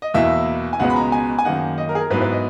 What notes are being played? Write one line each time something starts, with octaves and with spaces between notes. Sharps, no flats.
D#5
E2 B2 A#3 E4 E5
G#5
C#2 B2 G#3 B3 F#5
B5
A#5
G#5
G#5
F#2 D#3 A#3 D#4 F#5
D#5
A#4
G#4
A#4
G#2 F#3 B3 E4 B4
B4
D#5